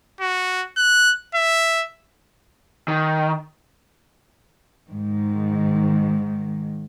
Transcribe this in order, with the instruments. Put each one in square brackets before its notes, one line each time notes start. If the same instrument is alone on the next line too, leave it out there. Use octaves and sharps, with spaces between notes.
[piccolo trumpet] F#4
F#6
E5
[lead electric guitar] D#3
[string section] G#2 D#3